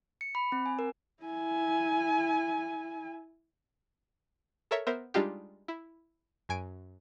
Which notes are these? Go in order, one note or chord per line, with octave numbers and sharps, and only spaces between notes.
C#7
B5
C4
G#5
A#4
E4 G#5
A4 A#4 C#5 E5
B3 A#4 C5 E5
G3 G#3 D4 D#4 F4 G4
E4
F#2 G#5 D7